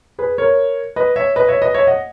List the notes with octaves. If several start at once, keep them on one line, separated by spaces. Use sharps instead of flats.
G#4 B4
A#4 C#5
B4 D#5
C#5 E5
B4 D#5
C#5 E5
B4 D#5
C#5 E5
D#5 F#5